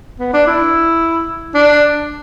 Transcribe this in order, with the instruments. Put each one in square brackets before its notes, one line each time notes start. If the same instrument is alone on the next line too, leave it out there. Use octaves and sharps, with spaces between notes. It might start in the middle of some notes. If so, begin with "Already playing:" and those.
[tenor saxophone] B3
D4
E4
D4